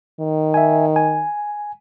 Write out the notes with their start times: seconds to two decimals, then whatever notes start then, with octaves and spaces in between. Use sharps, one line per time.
0.20 D#3
0.54 E5 G#5
0.96 G#5